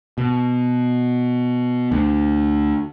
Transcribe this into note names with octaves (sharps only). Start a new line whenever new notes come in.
B2
D2